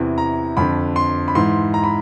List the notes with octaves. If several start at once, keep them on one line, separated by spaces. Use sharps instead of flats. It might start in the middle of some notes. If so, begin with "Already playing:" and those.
Already playing: E2 C3 E3
A#5
F2 D3 B5
C6
B5
G#2 E3 C6
A#5
B5